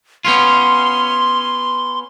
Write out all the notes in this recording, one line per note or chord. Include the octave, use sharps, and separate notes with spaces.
B3 C#4 F4 C6